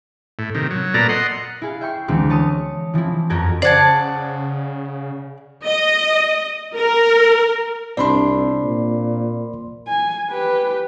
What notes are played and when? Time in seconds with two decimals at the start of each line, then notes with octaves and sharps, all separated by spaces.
0.39 A2
0.55 C3 D#3
0.71 F#3
0.94 A#2 B3 A4 D5 A#5
1.09 D#5 F#5 C6
1.62 E4 G#4 F5
1.81 E5 G5 C#6 C7
2.08 D2 E3 F3 G#3 C4
2.30 C#5 A5 C#6 D#6
2.94 E3 F3 C4 E4
3.30 F2 F#4 A4 A#4 G#6
3.62 C#3 C5 D5 F#5 A5 G#6
5.65 D#5
6.75 A#4
7.97 C2 C4 D4 D5 B5 C6
8.64 A#2
9.88 G#5
10.31 G4 B4